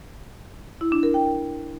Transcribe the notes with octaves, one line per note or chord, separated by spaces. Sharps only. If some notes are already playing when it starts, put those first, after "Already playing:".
E4
D4
A#4
G5